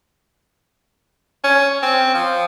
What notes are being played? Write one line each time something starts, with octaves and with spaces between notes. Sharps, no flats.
C#4
C4
F3